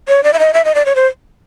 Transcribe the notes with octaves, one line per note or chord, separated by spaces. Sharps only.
C#5
D5
E5
D#5
E5
D#5
D5
C#5
C5